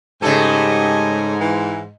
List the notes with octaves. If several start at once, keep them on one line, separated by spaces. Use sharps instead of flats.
G#2 C#3 A3 G4 A4 D#5 G#5
E3